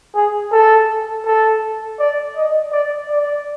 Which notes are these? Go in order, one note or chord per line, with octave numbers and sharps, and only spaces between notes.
G#4
A4
A4
D5
D#5
D5
D5